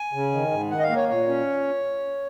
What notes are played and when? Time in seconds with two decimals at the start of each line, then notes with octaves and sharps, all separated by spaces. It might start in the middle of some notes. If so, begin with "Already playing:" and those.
Already playing: G#5
0.13 C#3
0.32 D#3
0.51 G#2
0.70 D#3 F#5
0.79 D#5
0.83 F5
0.89 A#3
0.96 C#5
1.08 A#2 C#5
1.28 C#4